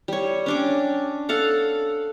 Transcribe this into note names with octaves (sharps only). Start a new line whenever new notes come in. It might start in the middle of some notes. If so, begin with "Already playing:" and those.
G3 C#5
C#4 D4 D6
A4 F5 F#5